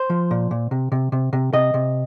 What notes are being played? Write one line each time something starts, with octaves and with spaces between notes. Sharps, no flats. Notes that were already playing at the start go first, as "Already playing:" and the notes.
Already playing: C5
F3
A#2
A#2
C3
C3
C3
C3
C3 D#5
C3